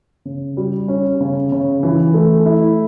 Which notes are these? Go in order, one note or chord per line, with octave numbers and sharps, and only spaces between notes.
C#3
G3
C#4
C#3
C#3
E3
A3
E4